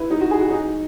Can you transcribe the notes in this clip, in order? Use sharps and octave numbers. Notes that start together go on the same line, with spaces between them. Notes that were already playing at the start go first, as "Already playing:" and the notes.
Already playing: E4 B4
D#4
F#4
G#4
F#4
D#4